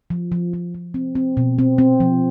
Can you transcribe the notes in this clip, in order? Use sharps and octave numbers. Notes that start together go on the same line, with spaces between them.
F3
F3
F3
F3
C4
C4
B2
C4
C4
F3